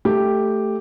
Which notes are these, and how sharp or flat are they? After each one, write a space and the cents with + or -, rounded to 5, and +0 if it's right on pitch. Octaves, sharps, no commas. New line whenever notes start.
A3 +0 G4 +0 G5 +0